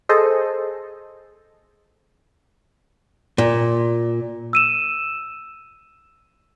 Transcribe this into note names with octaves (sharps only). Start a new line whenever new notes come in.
G#4 A4 C5 D#5
A#2
E6 D#7 E7